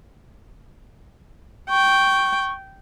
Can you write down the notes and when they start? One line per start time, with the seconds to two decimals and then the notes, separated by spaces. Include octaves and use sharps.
1.70 G5 C#6